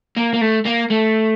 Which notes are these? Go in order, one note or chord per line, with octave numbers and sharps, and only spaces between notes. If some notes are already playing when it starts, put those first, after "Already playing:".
A#3
A#3
A3
A#3
A3